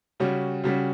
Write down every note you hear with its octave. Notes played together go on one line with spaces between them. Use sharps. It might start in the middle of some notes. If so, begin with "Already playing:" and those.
C#3 G3 C#4 F#4
C#3 G3 C#4 F#4